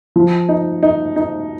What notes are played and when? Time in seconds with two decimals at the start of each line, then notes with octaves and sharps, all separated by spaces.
0.16 F3
0.49 D#4
0.83 D#4
1.16 D#4